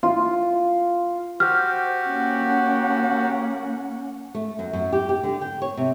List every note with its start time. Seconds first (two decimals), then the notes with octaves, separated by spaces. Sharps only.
0.03 F4
1.40 F#4 G4 C5 F6
2.06 A#3 C#4 F#5
4.35 A3
4.59 F#2
4.73 F#2
4.93 G4
5.09 G4
5.23 D3
5.41 G5
5.62 C#5
5.77 C3